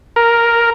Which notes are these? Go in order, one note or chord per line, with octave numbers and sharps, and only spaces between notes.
A#4